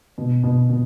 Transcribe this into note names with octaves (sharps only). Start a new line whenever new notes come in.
B2
B2
B2